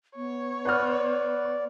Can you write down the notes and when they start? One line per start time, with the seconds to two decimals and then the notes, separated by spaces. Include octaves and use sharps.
0.16 B3 C#5
0.65 B4 D5 F#5 F6